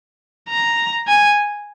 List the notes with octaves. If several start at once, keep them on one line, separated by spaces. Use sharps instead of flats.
A#5
G#5